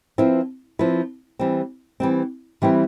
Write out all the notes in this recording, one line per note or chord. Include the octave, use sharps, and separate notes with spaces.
F3 C4 E4 B4
F3 C4 E4 B4
E3 G3 C4
E3 G3 C4
E3 G3 C4 E4 B4